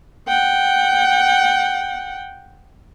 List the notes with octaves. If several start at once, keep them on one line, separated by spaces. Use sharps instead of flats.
F#5 G5